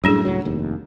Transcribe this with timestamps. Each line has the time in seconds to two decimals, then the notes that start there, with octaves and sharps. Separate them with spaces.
0.04 F#2 A2 G3 D4 G#4
0.25 C#2 A2 F#3
0.45 F1 D#2